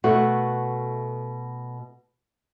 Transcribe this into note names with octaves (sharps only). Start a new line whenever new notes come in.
B2 A3 B3 F#4